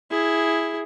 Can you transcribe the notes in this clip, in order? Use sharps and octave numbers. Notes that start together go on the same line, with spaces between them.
E4 G#4